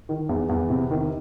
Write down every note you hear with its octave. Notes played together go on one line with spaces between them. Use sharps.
D#3
E2
E2
C3
D#3